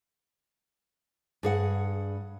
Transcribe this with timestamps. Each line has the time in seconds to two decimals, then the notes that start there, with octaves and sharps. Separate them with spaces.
1.43 G2 G#4 F#5